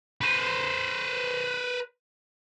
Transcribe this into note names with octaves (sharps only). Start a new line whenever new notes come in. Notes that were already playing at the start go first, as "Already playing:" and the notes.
B4 C5